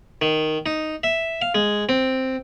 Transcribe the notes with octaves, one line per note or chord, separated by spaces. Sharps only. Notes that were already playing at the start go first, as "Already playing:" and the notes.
D#3
D#4
E5
F5
G#3
C4